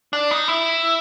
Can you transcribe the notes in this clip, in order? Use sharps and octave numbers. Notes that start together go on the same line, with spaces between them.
D4
D#4
E4